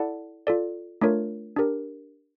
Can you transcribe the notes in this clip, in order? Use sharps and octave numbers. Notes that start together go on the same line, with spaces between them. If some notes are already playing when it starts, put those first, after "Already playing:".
Already playing: E4 A4 D5 F#5 A5
F4 A4 D5
A3 D4 F4 A#4 C#5
D4 G4 A#4